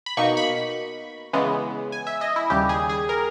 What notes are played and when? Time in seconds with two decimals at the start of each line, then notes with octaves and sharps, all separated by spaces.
0.06 B5
0.17 B2 A#3 D#4 C#6
0.37 B5
1.33 C#3 E3 G#3 B3
1.92 G#5
2.07 E5
2.21 D#5
2.36 E4
2.50 D#2 C#3 G3 G4
2.69 G#4
2.89 G#4
3.09 A#4